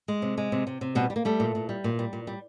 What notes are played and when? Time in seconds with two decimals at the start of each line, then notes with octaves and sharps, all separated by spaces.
0.08 G#3
0.22 C3
0.37 G#3
0.52 C3
0.67 C3
0.81 C3
0.95 B2 G3 B3
1.10 G3
1.16 A#3
1.25 G3 A3
1.40 A#2
1.55 A#2
1.69 G3
1.84 A#2
1.99 G3
2.13 A#2
2.27 G3